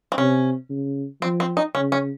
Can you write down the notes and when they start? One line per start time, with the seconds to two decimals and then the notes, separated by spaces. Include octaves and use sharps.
0.12 C4
0.18 C3 C#4
0.70 C#3
1.22 F3 C4
1.40 C4
1.57 D#4
1.75 C#3 C#4
1.92 C#4